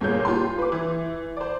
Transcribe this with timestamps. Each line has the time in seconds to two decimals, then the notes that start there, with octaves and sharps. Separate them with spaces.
0.01 G1 A#2 A#3 G#4 C#5 G6
0.25 F4 G4 C6
0.58 B4 D6
0.72 E3
1.37 C5 D5